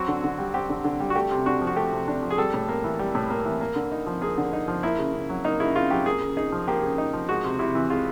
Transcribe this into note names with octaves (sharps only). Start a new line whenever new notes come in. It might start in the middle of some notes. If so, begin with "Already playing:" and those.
Already playing: F#3 C4 F#4
D3
D3
G3
C4 G4
D3
D3
G3
F#4
A3 G4
C3
D4 F#4
F3
F#4
A3 G4
C3
D4
F3
G#4
G3 A4
A2
A#3
E3
G3
A2
A#3
E3
A#3
D3
D#4
F3
A#3 G#4
D3
D#4
F3
A#3 E4
C#3
C#3
F#3
A#3 D#4
C#3 E4
C#3 F4
F#3 G4
A#3 G#4
C#3
D#4 G#4
F3
A#3 G4
C#3
D#4
F3
G#3 F#4
C3
C3 E4
E3
G#3 F4